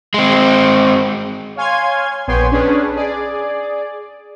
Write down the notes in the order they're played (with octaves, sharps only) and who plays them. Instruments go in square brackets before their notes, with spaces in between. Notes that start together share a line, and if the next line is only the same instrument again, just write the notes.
[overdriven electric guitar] G#3 C4
[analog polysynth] C#5 F5 G#5 C6 G#6
A#1 B3 C#5 G5 G#5 C6
C#4 D4 G#4 B4
G#4 D5